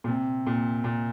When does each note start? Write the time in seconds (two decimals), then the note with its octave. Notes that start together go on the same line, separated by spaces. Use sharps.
0.04 A#2
0.08 C3
0.47 A#2
0.84 A#2